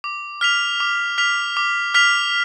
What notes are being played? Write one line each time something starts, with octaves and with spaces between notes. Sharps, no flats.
D6
F6 B6 F7
D6
F6 B6 F7
D6
F6 B6 F7